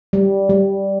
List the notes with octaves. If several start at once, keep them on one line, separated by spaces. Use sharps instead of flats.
G3
G3